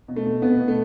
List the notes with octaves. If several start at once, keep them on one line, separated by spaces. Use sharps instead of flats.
B2
A3
B2
B2 B3
B2
A3